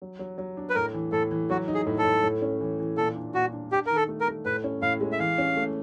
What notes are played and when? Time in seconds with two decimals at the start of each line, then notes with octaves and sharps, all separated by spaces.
0.02 F#3
0.19 F#3
0.38 F#3
0.57 D4
0.70 B4
0.75 A2 A#4
0.94 E3
1.12 A2 A4
1.31 E3
1.50 F#3 F#4
1.68 D#4
1.74 G#4
1.86 A2
1.98 A4
2.04 A2
2.23 A2
2.42 C#4
2.60 E3
2.79 E3
2.97 A#2 A4
3.16 D4
3.34 A#2 F#4
3.53 D4
3.71 D4 G4
3.86 D#3 A#4
3.96 A4
4.09 A3
4.20 A#4
4.27 A3
4.45 A2 B4
4.64 C#4
4.82 A2 F5
5.01 G#3
5.12 E5
5.19 E3 F5
5.38 C#4
5.57 A3